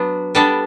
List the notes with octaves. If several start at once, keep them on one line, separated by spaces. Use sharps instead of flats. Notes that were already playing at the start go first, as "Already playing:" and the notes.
Already playing: F#3 B3 D4
G3 B3 D4 A4